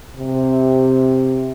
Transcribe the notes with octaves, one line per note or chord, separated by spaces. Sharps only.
C3